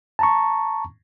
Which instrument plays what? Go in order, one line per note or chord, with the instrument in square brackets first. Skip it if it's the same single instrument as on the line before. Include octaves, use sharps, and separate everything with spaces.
[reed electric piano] A5 A#5 C#6